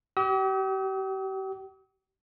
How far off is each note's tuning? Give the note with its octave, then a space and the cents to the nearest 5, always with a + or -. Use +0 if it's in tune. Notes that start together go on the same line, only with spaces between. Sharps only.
G4 -40 D#6 +45